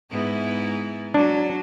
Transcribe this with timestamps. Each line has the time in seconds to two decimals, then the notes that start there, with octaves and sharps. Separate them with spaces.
0.11 G#2 B3 E4
1.14 F#3 D4